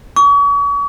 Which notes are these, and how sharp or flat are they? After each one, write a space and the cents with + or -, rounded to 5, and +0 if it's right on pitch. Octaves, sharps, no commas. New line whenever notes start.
C#6 +40